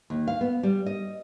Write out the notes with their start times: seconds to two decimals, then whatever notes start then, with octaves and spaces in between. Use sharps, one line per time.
0.10 D#2
0.27 F5
0.41 B3
0.63 G3
0.86 D#5